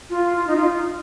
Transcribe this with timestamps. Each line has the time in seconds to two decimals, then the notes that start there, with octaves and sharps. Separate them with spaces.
0.10 F4
0.37 F4
0.47 D#4
0.56 F4